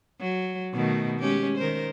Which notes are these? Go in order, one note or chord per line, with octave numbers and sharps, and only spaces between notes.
F#3
B2 D#3 A3
G#3 C#4 G4
D#3 A#4 C5